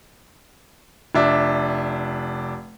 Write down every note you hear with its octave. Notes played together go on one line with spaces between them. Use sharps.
F1 D4 E5